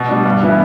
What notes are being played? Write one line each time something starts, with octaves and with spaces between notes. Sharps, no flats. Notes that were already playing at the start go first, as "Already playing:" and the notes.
Already playing: B2
G3 D4
G2
E3 B3 E4